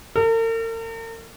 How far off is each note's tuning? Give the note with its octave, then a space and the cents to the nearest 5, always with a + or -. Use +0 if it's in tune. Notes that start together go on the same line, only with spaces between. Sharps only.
A#4 -45